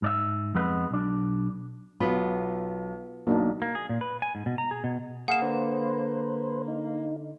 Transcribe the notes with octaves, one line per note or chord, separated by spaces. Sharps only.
G#2 D5 E5
F2 G#3 B3 B4
B1 D4
B1 B3 F4 B5
B1 A#3 D4 D#4
A#3
G#4
A#2
B4
G#5
G#2
B2
A#5
G#4
B2
A#3 G#4 F5 F#5 E7
D3 B4 C5
D#4